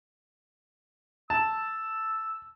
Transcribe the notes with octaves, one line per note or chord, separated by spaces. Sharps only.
A5 E6